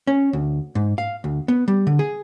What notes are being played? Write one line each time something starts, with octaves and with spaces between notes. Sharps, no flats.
C#4
D2
G#2
F5
D2
B3
G3
D3
G#4